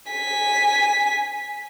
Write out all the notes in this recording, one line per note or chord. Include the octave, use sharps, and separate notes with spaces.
G#5 B6